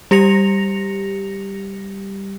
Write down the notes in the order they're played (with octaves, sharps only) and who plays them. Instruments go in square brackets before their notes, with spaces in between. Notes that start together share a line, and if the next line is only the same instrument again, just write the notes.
[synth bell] G3 G4 A#6 C#7 F7